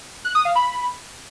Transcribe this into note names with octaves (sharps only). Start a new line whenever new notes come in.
F#6
D#6
F5
B5